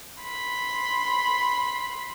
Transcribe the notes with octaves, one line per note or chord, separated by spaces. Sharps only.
B5 C6